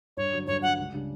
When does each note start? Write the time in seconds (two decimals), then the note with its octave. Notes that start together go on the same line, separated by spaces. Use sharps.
0.17 G2 C#5
0.32 D3 F#3
0.47 G2 C#5
0.62 D3 F#3 F#5
0.77 C#2
0.93 C#3 G3 D4 G4